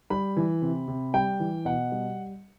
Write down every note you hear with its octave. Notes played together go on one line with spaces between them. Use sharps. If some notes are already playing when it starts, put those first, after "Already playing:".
G3 B5
E3
C3
C3
G3 G5
E3
B2 F#5
G3